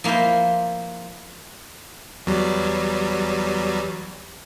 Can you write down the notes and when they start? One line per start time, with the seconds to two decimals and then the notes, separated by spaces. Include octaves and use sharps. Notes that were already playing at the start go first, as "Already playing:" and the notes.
0.04 F3 A#3 E4 A#4 C5
2.26 E2 F#3 G3